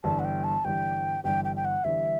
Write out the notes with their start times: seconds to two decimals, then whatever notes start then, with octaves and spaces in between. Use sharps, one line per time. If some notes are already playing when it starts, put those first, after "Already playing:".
0.04 G1 G2 E3 G3 A5
0.19 F#5
0.25 G5
0.44 A5
0.65 G1 G2 E3 G3 G5
1.24 G1 G2 E3 G3 G5
1.45 G5
1.56 G5
1.65 F#5
1.84 G1 G2 E3 G3 E5